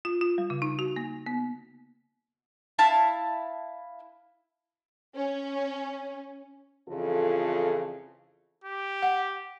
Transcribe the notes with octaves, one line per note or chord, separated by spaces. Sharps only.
F4
F4
G3
C#3
D#4
F#4
A#3
B3
E4 F5 A5
C#4
F2 C#3 E3 F4 A4
G4
F#5